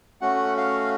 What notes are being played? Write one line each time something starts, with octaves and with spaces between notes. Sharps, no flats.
A3 C#4 F#4 F#5
F5